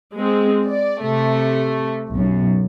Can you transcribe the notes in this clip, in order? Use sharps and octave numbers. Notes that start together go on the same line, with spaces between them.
G#3 C4
D5
C3 A3
B1 F#2